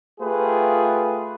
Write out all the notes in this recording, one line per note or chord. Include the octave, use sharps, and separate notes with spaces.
A3 F4 G4 G#4 B4